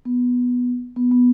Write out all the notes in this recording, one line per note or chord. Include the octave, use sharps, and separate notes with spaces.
B3
B3
B3